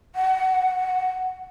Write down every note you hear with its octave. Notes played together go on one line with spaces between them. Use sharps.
F#5